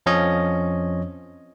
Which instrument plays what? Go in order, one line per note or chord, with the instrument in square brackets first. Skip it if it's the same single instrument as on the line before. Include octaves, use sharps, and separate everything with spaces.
[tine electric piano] F2 F3 C#4 C#5 D#5